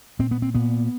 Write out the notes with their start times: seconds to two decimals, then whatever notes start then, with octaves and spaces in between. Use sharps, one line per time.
0.19 A#2 C4
0.31 B3
0.42 C4
0.55 A#2 B3